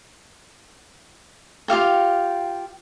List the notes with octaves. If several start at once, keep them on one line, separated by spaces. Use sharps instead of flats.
F4 G4 F5 G5